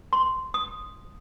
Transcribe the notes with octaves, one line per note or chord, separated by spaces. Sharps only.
C6
D#6